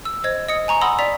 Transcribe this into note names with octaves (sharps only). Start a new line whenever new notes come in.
E6
C5 D#5 G#6
D#5 D#6 C#7
G#5 A#5 C#6
F#5 B5 C6 D#6 E6 A#6
D5 B6 F7